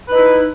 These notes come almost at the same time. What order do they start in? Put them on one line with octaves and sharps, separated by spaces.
B4 D#4 E4